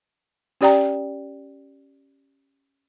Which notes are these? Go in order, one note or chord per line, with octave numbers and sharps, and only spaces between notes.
C#4 G4 D5 G5 A#5